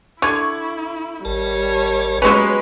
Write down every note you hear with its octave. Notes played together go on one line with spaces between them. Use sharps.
D3 E4 C#6 G#6
G#1 G3 A#4 C#5 A5
F#3 G#3 B3 C#4 B4